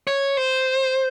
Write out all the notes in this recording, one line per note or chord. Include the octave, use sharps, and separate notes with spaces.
C#5
C5